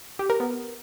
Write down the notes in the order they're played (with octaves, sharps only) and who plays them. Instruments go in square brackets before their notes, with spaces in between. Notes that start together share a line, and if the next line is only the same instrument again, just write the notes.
[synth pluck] G4
A#4
B3